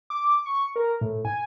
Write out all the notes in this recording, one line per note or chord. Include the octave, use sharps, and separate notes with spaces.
D6
C#6
A#4
A2
G#5